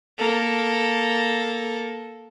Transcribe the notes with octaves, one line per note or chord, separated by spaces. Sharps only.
A#3 A4